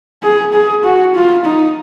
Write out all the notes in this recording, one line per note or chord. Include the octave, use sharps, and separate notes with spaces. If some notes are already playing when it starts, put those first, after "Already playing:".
G#4
G#4
F#4
F4
D#4